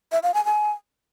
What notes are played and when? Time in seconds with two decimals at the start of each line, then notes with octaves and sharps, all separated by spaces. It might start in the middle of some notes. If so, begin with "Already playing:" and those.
0.12 E5
0.23 F5
0.34 G#5
0.45 G#5